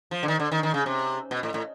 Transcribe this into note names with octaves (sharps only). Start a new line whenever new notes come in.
F3
D3
D#3
D3
D#3
D#3
C#3
C3
B2
A2
A2